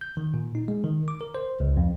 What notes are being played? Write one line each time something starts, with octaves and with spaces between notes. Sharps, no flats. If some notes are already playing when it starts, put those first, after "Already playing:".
G6
D#3
A#2
D#4
G#3
D#3
D6
A#4
C5
C#2
F2